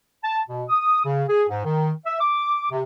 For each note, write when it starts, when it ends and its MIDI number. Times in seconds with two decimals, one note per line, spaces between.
0.24 0.41 81
0.49 0.64 47
0.70 1.04 87
1.05 1.24 49
1.29 1.44 68
1.49 1.65 44
1.65 1.92 51
2.06 2.17 76
2.21 2.67 86
2.71 2.83 48